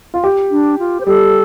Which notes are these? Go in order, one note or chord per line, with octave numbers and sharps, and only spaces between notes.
F4
G4
D4
F4
C5
G3 A4